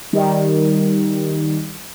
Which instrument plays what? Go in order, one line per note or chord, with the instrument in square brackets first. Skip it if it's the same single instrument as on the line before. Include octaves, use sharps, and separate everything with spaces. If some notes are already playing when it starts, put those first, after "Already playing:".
[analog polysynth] D#3 G3